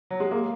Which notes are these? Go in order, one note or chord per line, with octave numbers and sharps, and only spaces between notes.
F#3
G#3
A#3